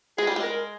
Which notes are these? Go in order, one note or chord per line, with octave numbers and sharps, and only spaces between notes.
G#3 G#4
G3
G#3
A#4